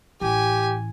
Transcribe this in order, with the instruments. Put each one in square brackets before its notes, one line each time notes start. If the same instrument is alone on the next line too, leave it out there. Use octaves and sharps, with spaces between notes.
[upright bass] A1 [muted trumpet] G4 [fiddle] G#5